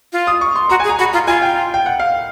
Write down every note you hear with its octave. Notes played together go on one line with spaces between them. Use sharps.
F4
D#6
C#6
C6
F#4 A#5
G#5
G#4
A#5
F#4 B5
F4 A#5
F4 G#5
G5
G5
F#5
F5